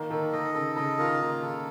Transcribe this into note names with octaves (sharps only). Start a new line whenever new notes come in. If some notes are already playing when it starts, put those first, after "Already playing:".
Already playing: D#3 A#3
D#3 A4
D#3 D#5
C#3 A4
C#3 D#5
D#3 F4
D#3 A#3
C#3 A4